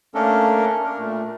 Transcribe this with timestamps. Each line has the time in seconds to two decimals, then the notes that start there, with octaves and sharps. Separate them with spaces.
0.14 A3 A#3 C#4 D4 A4 A#4
0.84 D4 A#4
0.99 A#2 A3